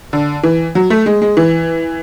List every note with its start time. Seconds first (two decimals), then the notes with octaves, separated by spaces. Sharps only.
0.13 D3
0.43 E3
0.75 F#3
0.90 A3
1.06 G#3
1.22 G#3
1.37 E3